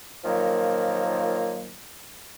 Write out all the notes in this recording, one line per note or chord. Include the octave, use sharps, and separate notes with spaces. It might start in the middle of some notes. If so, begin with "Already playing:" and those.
A#2 D#3 F3 F#3 A#3